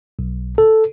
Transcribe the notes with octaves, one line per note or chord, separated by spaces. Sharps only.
B1
A4